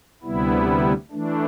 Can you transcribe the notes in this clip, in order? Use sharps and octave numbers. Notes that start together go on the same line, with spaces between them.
D2 C3 G3 B3 E4
E3 A3 D4